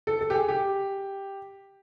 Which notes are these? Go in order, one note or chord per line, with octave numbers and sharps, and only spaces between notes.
A4
A4
G4
G#4
G4